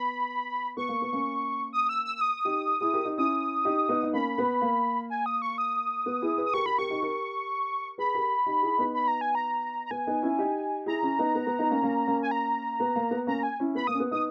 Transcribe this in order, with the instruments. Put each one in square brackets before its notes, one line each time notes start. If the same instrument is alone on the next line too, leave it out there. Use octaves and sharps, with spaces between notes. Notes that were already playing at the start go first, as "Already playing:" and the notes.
Already playing: [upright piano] B3 [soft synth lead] B5
[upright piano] B3 [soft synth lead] C#6
[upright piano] A#3
B3
A#3 C#4
[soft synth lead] D#6
E6
E6
E6
D#6
[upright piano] D#4 G4
E4 G#4
G4 A#4
D#4 G4
[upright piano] C#4 E4 [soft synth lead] D#6
[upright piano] D#4 G4
B3 D#4
D#4
[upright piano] A#3 C#4 [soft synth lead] B5
[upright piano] B3
A#3
[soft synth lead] G#5
D#6
C#6
D#6
[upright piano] B3
E4 G#4
G#4 B4
[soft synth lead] D#6
[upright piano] G4 A#4 [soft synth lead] C#6
[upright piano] G4 A#4 [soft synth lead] B5
[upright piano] G4 A#4 [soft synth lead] C#6
[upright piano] D#4 G4
G4 A#4
[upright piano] G#4 B4 [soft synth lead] B5
[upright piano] G4 A#4
D#4 G4
E4 G#4
B3 D#4
[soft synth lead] B5
A#5
G#5
A#5
A#5
[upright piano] B3 [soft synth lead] G#5
[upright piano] B3 D#4
C#4 E4
D#4 G4
[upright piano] E4 G#4 [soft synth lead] A#5
[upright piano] C#4 E4
B3 D#4
B3
B3
B3 D#4
A#3 C#4
A#3 C#4
A#3 C#4
[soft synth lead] G#5
A#5
[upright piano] B3
A#3
B3
[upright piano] A#3 C#4 [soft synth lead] A#5
[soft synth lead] G#5
[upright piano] C#4 E4
[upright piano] B3 [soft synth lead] B5
[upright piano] A#3 [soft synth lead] D#6
[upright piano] C#4
B3
[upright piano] B3 D#4 [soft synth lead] D#6